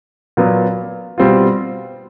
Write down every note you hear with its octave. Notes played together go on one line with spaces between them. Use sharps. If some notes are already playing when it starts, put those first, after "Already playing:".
A#2 F#3 B3
B2 G3 C4 F4